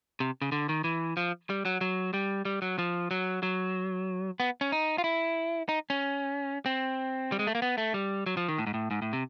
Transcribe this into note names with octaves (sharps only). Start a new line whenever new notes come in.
C3
C#3
D3
D#3
E3
F3
G3
F#3
F#3
G3
G3
F#3
F3
F#3
F#3
B3
C#4
D#4
F4
E4
D#4
C#4
C4
G3
G#3
A3
A#3
B3
A3
G3
F#3
F3
D#3
A2
G#2
A2
G#2
A2
C3